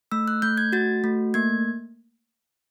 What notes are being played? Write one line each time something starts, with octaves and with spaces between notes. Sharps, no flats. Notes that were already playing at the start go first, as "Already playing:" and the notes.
A3 E6
F#6
A3 G6
G#6
F#4 A6
A3
A#3 G#6